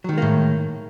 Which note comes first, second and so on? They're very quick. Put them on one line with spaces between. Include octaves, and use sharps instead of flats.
F#3 D#3 G#3 A#3 A2